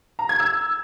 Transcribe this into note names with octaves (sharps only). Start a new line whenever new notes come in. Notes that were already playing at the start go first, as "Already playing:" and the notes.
A#5
G#6
E6